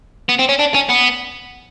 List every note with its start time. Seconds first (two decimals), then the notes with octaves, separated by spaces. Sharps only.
0.29 B3
0.39 C4
0.49 C#4
0.59 D4
0.74 C#4
0.89 B3